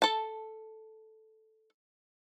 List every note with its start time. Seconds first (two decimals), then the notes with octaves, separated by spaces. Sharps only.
0.02 A4 A5